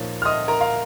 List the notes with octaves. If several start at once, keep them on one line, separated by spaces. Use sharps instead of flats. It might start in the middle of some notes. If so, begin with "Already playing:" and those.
Already playing: A#2 F3 A#3 D#4 C#5
F6
D#5 D#6
A#4 A#5
F5